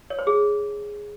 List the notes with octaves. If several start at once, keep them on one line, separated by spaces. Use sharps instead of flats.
C#5
C5
G#4